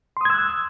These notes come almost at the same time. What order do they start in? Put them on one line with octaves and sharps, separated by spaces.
C6 D#6 G#6 E6 F#6